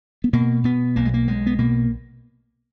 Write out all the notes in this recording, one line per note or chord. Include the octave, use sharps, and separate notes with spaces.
B3
B2 A#3
B2 B3
B1 A#3
G#3
A#3
B1 G#3
B3
B2 A#3